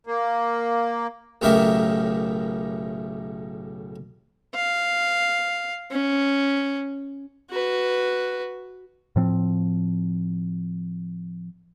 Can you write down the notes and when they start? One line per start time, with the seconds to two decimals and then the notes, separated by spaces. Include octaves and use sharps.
0.07 A#3
1.42 B1 A2 C#3 G4 A#4 E5
4.55 F5
5.91 C#4
7.50 F#4 B4
9.16 A2 F3 C4